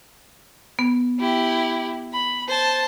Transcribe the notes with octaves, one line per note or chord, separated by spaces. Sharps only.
B3
E4 G4
B5
C5 A5